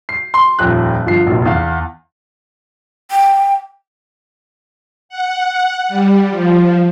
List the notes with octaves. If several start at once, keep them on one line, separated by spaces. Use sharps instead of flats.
C7
C6
D#1 F2 F#6
G1 F3 C7
F1 A#1
E2 F5
G5
F#5
G3
F3